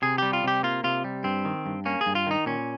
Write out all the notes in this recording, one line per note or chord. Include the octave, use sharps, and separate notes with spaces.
C3 G#4
G3 G4
F4
C3 G4
A#3 F4
C3 F4
G3
G2 C4
D#3
G2
A#3 C#4
G#4
G2
F4
D#3 D#4
A#2 C#4